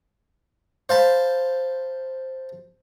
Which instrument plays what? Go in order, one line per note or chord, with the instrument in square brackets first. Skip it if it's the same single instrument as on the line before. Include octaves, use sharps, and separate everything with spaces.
[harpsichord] C5 F5 A5 B5